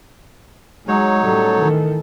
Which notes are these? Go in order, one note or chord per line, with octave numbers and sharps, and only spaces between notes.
F#3 G#3 D#4 C#5
A2 G3 C#4 A4
D#3 E3